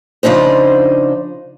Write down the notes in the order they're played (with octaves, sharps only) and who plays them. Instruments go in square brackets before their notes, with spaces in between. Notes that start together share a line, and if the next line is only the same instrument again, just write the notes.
[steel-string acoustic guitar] C#3 F3 D4 D#4 C5